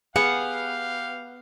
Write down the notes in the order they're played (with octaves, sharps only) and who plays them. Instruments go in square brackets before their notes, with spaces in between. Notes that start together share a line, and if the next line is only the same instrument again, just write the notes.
[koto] B3 [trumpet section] G4 F5 [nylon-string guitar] G#4 [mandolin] F#5